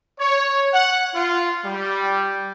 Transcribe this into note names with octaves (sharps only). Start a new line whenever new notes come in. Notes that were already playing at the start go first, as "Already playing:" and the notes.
C#5
F#5
F4
G3